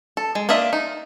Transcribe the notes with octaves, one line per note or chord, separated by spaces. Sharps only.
A4
G#3
A#3 D4 F4 D#5 E5
D#4